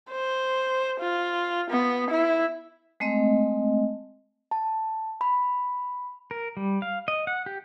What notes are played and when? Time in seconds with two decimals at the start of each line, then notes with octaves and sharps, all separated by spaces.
0.12 C5
1.00 F4
1.70 B3
2.10 E4
3.00 G#3 A3 C4 D#5
4.51 A5
5.21 B5
6.31 A#4
6.57 G3
6.82 F5
7.08 D#5
7.27 F#5
7.46 G4